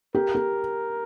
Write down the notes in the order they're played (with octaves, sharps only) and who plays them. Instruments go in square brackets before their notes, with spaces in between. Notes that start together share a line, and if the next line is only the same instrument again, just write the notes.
[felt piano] G4 [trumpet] A#4
[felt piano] G4